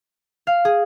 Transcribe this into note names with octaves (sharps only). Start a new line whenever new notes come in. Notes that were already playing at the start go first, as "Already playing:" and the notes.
F5
G#4